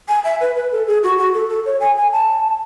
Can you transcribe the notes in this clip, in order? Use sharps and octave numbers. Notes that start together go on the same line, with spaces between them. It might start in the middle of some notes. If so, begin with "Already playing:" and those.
G#5
E5
B4
B4
A4
G#4
F#4
F#4
A4
A4
C#5
G#5
G#5
A5